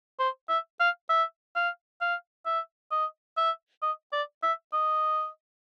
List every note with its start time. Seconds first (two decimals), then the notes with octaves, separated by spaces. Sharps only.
0.20 C5
0.49 E5
0.80 F5
1.10 E5
1.55 F5
2.01 F5
2.46 E5
2.91 D#5
3.37 E5
3.82 D#5
4.13 D5
4.43 E5
4.73 D#5